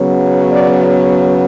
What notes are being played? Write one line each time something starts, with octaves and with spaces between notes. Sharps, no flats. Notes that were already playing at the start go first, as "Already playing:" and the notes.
Already playing: C#3 F#3 B3
D5